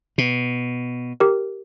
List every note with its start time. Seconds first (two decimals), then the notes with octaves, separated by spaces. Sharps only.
0.18 B2
1.20 G4 A#4